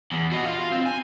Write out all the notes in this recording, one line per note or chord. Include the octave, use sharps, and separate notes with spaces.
E2
F#4 D#5
F4 F5
C4
G#5